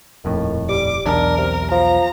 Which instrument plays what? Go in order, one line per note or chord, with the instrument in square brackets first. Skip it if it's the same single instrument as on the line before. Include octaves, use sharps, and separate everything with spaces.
[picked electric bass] D#1 F2 A2 [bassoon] D#3
[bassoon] G3 [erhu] D6
[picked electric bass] B1 E2 [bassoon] D4 [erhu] A#4
[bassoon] C3
[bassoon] F3 [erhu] A#5